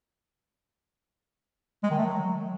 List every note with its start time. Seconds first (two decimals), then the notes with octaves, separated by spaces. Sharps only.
1.83 G#3
1.91 D#3
1.98 A3
2.05 F#3